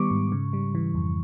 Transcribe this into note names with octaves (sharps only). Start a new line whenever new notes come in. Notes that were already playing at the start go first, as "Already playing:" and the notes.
Already playing: D#3 G3 B3 C#6 D6
G#2
C#3
G3
E3
F2